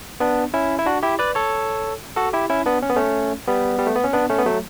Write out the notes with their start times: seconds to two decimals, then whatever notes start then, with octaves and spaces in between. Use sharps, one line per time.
0.20 B3 D4
0.54 C#4 E4
0.79 E4
0.86 D4 F#4
1.03 E4 G4
1.19 B4 D5
1.35 A4 C#5
2.16 F#4 A4
2.33 E4 G4
2.50 C#4 E4
2.66 B3 D4
2.82 C#4
2.90 B3
2.96 A3 C#4
3.47 G3 B3
3.78 G3
3.87 A3
3.96 B3
4.04 C#4
4.13 B3 D4
4.29 A3 C#4
4.38 B3
4.46 F#3 A3